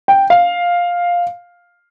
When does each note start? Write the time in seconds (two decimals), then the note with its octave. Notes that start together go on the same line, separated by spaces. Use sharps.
0.08 G5
0.30 F5